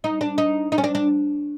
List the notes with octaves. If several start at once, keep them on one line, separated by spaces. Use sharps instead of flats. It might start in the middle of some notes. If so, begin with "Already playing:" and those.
D#4
D4
D#4
D#4
C#4
D4
D4